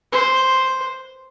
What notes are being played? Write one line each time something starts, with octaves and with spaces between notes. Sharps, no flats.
C5